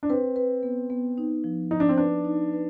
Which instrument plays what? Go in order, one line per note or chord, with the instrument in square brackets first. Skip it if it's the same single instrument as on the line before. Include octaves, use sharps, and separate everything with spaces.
[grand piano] D4
[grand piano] C4 [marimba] B4
[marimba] B4
B3
B3
D#4
F3
[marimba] F3 [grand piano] D#4
[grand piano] D4
C4
[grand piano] D4 [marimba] B4
[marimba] D#4
B4